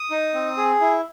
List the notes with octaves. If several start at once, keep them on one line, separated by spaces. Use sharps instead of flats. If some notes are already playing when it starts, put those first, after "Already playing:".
Already playing: D#6
D#4
C4
G#4
E4